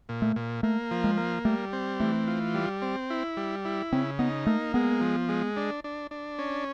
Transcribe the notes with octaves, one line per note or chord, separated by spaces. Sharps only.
A#2
A3
A#2
A3 A#3
F3
G#3
A#3
G3 A3
C4
E3 A3
F4
G3
C4
E4
G3
E4
C#3 C4
B3 D#4
A3 A#3
G#3 B3
F3
G#3
D4
D4
D4
C#4